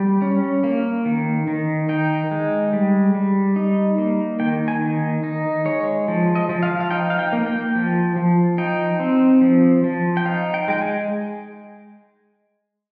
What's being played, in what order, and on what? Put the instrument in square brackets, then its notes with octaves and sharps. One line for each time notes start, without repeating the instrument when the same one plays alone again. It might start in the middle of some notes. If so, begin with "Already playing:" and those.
Already playing: [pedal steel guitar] G3 G5
C#4
A#3
D#3
D#3
D#4 G5
G#3
G3
G3
D#4
A#3
D#3 G5
G#5
D#3
D#4
G#3 C#5
F3
D#5
F3
F5
F5
D#4 G5
F5
G5
A#3
G5
F3
F3
D#4 G5
C4
F3
F3
G5
D#4 F5
G5
G#3 G5
G#5